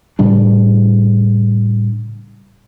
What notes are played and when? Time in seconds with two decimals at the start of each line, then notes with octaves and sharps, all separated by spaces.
0.19 A2 C#3 G3 D4